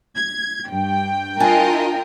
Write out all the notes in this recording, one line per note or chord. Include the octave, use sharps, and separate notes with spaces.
G#6
G2 G5
D4 F4 A#4 D#5 G#5